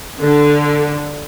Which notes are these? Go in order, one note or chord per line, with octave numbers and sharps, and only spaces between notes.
D3